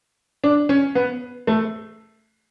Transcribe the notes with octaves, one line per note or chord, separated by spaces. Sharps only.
D4
C#4
B3
A3